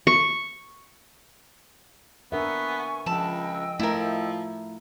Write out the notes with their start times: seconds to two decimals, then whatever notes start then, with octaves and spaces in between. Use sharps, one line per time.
0.07 C#6
2.32 B3 D4 A#4 E5 G#5 C#6
3.06 C#2 F3 D#5 G5 A5 B5 E6
3.79 F3 A3 E4 F4 A#4 F5